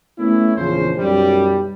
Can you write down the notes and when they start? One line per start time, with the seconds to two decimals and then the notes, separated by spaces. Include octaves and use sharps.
0.18 A3 B3 C#4 E4
0.56 A#1 E2 C#3 F3 C5
0.98 B1 F#2 G3